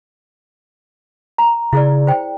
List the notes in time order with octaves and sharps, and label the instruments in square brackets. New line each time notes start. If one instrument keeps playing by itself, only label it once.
[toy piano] A#5
[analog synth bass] C#3 [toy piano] E4 G#4 D5
[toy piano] C5 G5